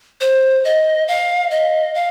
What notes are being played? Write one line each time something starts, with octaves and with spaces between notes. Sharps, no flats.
C5
D#5
F5
D#5
F5